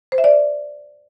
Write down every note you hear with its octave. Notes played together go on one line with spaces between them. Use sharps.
C5
E5
D5